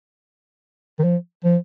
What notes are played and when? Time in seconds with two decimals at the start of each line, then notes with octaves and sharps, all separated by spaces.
0.99 D#3
1.04 F3
1.44 F3